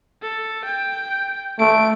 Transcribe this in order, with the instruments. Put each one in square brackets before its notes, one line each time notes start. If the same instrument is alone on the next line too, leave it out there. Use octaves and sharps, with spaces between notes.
[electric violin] A4
G5
[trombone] A3 [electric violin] D7